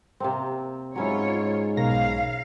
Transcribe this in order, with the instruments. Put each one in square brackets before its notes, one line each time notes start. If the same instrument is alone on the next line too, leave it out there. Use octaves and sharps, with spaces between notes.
[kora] C3 A#3 C4
[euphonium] G#2 [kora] F#3 C#4 E4 [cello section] F4 C#5
[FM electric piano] B1 A#6 [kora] A#4 C#5 [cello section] F5